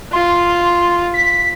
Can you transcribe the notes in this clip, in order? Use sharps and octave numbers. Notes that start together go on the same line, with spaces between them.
F4 C6
B6